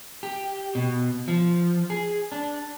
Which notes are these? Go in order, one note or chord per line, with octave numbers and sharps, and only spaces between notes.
G4
B2
F3
G#4
D4